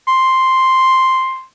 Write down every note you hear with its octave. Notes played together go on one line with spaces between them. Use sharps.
C6